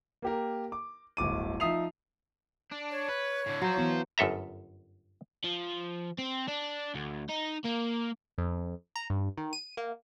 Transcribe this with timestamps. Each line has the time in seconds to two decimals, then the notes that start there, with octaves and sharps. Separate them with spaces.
0.22 A#3 G4 A#4
0.72 D6
1.17 D1 G1 D6 D#7
1.60 F3 D#4 E5 D#6 C7 F7
2.71 D4
2.91 C#5
3.08 B4
3.46 A2 D3
3.62 F#3 F4 C5
3.77 E3 B3 E4
4.18 G1 F#2 A4 E5 A#5
5.44 F3
6.18 C4
6.48 D4
6.95 D2
7.29 D#4
7.65 A#3
8.38 F2
8.96 A#5
9.10 G2
9.38 D#3
9.53 D#7
9.77 A#3